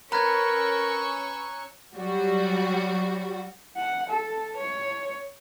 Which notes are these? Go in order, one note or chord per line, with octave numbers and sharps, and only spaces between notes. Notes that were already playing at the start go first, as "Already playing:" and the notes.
C#4 A#4 B4 A#5 C#6 E6 F#6 G#6
F#3 G3 F#4
F#5
A4
C#5